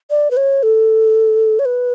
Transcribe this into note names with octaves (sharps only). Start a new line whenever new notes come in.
D5
B4
C#5
A4
C#5
B4